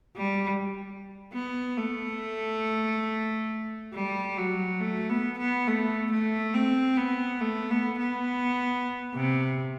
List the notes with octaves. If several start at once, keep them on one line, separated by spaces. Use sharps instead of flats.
G3
B3
A3
G3
F#3
A3
B3
B3
A3
A3
C4
B3
A3
B3
B3
C3